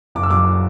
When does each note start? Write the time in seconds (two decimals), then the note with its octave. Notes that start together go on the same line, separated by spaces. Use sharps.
0.15 F#1 D6
0.23 E6
0.30 F#2 D6